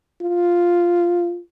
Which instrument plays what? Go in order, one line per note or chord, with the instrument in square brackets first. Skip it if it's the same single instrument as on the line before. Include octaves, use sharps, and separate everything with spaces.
[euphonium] F4